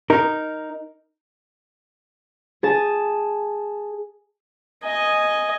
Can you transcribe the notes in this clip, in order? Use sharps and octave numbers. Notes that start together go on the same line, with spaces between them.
D#4 A#4
G#4 A5
D#5 G#5